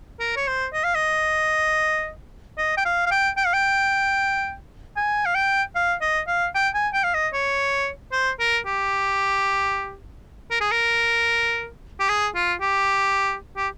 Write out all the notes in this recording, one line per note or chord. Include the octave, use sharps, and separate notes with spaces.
A#4
C#5
C5
D#5
F5
D#5
D#5
G5
F5
F5
G5
G5
F5
G5
G#5
F5
G5
F5
D#5
F5
G5
G#5
G5
F5
D#5
C#5
C5
A#4
G4
A#4
G#4
A#4
G4
G#4
F4
G4
G4